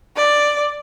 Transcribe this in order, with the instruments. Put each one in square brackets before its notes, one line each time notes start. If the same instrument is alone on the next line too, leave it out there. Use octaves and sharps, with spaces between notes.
[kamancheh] D5